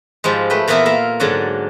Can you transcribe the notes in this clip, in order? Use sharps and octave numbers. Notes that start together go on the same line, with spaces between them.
G#2 F3 G3 G#3
A3 B4 G5
A#2 E3 A#3 B3 E4 A#4
A#3 A#4 E5 F5
G#2 D3 F#3 D5 F#5